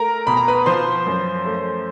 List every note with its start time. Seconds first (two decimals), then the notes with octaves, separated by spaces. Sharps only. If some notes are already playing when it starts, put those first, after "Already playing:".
Already playing: A3 A#4 A#5
0.27 B2 B5
0.37 A#5
0.48 B4 B5
0.66 F3 C5 C6
1.07 F#2
1.46 A3